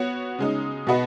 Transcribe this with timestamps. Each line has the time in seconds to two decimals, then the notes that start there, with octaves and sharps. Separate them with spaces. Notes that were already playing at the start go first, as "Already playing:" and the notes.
Already playing: B3 F#4 C#5
0.39 C#3 G#3 D#4
0.87 B2 B3 F#4 B4 D#5